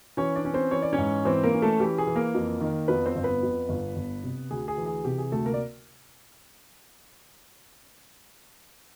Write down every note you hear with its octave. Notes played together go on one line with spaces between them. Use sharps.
E3 C#4 C#5
D4 D5
C#4
C4 C5
E3 C#5
D5
C#4 C#5
G#2
E3 C4 C5
A#3 A#4
C#4
A3 A4
E3 G4
G#4
E3
A#3 A#4
F2
D#3
F2 B3 B4
C4 C5
G1
B3 B4
F2
G1
G1
C3
D2 G#4
G#4
E3
G#4
C3 G4
G#4
D2 A3 A4
A#3 A#4
D5